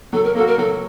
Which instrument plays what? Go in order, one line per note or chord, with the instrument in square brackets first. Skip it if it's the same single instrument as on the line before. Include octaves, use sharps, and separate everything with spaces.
[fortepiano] F#3 [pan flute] A4
[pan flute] A#4
[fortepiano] A#3 [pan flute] A4
[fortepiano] F#4
[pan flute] A#4
[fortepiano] F#3 [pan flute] A4